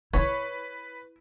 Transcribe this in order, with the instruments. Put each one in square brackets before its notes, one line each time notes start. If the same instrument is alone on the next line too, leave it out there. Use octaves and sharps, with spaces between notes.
[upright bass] E4 [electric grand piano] B4 [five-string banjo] C#5